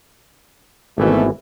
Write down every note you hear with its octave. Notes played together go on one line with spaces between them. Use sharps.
G#1 B2 E3 A3